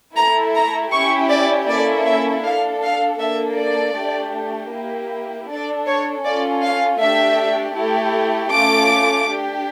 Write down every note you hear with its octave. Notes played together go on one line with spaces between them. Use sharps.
A3 E4 A4 A#5
A#5
C#4 E4 G4 C#6
D5
A#3 C#4 E4 A4 D5
E5
D4 A4 F5
F5
A#3 D4 A4 E5
D5
A3 D4 G4
A#3 E4 G4
D4 A4 D5
C#5
C#4 F4 A4 D5
F5
A3 D4 G4 E5
A3 E4 G4
A3 C#4 F4 D6
D4 G4